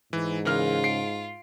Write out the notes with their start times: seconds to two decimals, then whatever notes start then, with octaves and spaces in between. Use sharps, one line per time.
0.13 G#2 E3
0.45 C#3 E3 F4 A#4 F6
0.84 C7 D7